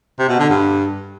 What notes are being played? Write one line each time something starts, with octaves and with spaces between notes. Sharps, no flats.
C3
B2
D3
G2